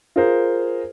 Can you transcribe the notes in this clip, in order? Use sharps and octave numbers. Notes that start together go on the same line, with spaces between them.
F4 G#4 A#4 C5